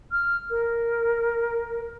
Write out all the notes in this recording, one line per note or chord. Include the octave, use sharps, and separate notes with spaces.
F6
A#4